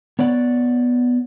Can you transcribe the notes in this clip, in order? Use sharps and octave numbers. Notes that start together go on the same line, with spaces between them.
B3 C#5 D5 F#5